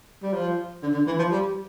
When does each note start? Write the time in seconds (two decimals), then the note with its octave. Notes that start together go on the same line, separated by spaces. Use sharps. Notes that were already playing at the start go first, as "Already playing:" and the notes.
0.22 G3
0.34 F3
0.83 D3
0.94 D3
1.07 E3
1.18 F3
1.31 G3